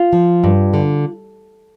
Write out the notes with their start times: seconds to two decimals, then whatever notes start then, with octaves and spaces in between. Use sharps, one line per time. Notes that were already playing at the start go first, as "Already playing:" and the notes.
Already playing: F4
0.13 F3
0.44 G2
0.74 D3